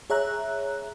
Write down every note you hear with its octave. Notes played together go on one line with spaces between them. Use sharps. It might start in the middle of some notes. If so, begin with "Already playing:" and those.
G#4 C#5 E5 A#5 F#6